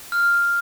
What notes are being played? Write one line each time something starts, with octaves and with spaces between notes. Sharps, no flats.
F6